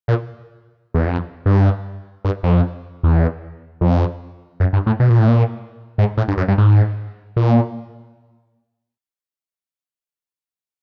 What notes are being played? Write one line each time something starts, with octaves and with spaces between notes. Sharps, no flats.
A#2
E2
F2
G2
G2
F2
E2
F2
F#2
G2
A2
B2
A#2
A2
A#2
G#2
A2
G2
F#2
G2
G#2
A#2